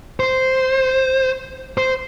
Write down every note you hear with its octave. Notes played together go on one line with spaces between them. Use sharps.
C5
C5